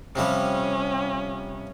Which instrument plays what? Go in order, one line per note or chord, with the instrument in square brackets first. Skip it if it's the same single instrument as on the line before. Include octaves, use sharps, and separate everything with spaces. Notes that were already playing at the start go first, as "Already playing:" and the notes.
[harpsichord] C3 F3 G3 [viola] C#4